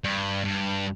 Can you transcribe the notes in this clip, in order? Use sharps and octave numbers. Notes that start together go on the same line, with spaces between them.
G2
G2